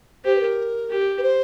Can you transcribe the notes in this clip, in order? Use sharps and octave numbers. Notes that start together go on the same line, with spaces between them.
G4 C5
B4
A#4
G4
B4
C5